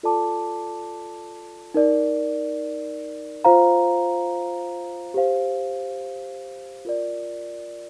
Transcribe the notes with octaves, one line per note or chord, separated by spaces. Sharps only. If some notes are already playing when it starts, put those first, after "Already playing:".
F4 A4 D5 A5 D6
D#4 A#4 D5
F4 C5 F5 A#5
G4 C5 F5
F4 A#4 D5